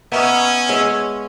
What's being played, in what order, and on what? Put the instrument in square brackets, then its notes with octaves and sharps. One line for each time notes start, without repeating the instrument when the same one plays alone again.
[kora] B3 D#4 E5 [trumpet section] C#4
[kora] G#3 C#5 E5